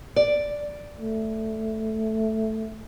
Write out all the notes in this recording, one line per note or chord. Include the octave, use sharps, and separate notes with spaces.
D5
A3